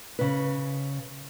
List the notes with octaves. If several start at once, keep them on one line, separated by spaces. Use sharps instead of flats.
C#3 B4